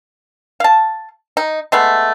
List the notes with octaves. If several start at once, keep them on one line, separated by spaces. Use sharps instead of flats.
F5 A5
D#4
G#3 A3 B3